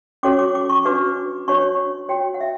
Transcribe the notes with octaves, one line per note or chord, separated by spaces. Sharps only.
C#4 F#4 A4 C#5 D6
D6
D6
C#6
D4 F#4 B4 D6
D4 F#4 C#5 C#6
F#4 C#5 G5
F#5
E5